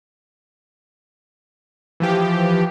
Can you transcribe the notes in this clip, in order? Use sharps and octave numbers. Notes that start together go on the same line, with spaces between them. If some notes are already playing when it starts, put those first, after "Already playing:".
E3 F3 G4